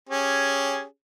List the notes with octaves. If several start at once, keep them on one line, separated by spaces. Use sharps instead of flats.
C#4 G4 G#4